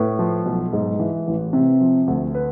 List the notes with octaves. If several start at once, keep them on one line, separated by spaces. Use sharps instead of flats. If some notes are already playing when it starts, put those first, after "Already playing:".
Already playing: A2 B4
F3
B1
G#2
E3
A1
C3
F3
D2
B4